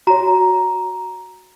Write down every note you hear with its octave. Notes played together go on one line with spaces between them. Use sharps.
F#4 C#5 A#5